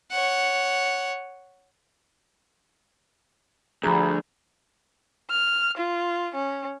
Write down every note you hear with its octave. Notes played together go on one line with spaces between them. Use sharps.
C#5 F#5
D2 F3 G3 G#4 A#5 B5
F6
F4
C#4